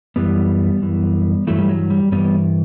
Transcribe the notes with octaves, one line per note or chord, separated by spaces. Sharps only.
F#2 E3 G3 B3
F#2 E3
G2 E3 F#3 A3
G3
F#3
G3
G2 E3 G3 B3